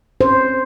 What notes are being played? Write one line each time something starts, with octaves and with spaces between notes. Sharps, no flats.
C#4 C5